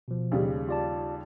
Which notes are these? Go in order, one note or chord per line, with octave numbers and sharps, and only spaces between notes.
B2 F3
D#2 C#3 G3
F4 D5 A5